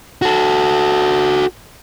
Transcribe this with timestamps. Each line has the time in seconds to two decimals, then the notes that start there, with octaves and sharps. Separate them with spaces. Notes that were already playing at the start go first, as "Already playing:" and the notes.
0.22 F#4 A4